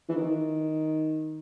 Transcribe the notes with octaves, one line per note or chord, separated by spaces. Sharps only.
E3
D#3